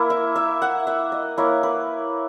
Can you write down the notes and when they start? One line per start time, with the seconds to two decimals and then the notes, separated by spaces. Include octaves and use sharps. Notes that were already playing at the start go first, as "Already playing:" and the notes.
Already playing: A#3 E4
0.10 E5
0.36 E5
0.62 F#5
0.87 E5
1.12 D#5
1.38 A#3 E4 C#5
1.63 B4